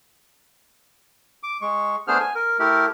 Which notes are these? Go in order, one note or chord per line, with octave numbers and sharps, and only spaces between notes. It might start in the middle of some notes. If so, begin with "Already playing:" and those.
D6
G#3 C#6
A3 B3 D4 G#4 C5 F6
G#5
A#4
A3 E4 G4 A#4